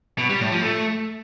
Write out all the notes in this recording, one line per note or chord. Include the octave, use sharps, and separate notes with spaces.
B2
G3
A2
F3
A3